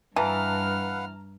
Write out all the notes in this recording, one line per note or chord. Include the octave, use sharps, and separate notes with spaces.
G2 E3 B4 F5 F#5 A5 A#5 F6